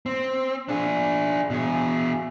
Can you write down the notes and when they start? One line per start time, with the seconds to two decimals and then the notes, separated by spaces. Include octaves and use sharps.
0.06 C4
0.69 D4 G#4
1.50 B2 G#4